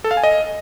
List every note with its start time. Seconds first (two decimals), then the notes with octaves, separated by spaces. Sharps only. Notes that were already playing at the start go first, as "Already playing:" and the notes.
0.04 A4
0.11 F5
0.17 G#5
0.23 D#5